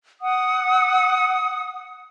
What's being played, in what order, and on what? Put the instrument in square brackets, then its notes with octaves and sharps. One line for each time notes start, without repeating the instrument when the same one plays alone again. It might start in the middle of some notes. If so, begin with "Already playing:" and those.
[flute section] F#5 D#6